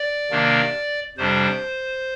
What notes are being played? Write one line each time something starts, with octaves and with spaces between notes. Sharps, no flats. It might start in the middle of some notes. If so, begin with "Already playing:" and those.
Already playing: D5
C3 D#3 A#3 D4
F2 C3 G3 D4 C5